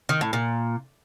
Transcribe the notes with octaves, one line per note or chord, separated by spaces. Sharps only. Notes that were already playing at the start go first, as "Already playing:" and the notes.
D#3
A2
A#2